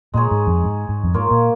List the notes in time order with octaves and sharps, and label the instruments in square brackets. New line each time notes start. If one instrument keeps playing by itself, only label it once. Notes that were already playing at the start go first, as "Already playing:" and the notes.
[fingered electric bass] A#2 [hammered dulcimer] G#3 D#4 G#4 C#5
[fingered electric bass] G#2
F2
G#2
G#2
F2
[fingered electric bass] G#2 [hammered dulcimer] A#3 F4 C#5
[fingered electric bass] A#2